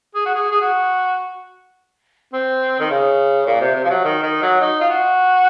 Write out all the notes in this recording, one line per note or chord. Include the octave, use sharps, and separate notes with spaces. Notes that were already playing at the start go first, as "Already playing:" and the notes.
G#4
F#4
G#4
G#4
F#4
C4
D#3
C#3
A#2
C3
C3
F3
F#3
D#3
D#3
F#3
D#4
F4
F#4